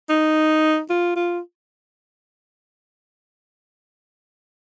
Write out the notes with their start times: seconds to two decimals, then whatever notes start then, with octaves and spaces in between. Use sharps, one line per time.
0.09 D#4
0.90 F4
1.16 F4